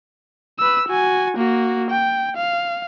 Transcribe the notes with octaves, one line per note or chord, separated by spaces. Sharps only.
B4 E6
F#4 G#5
A#3 F#4
G5
F5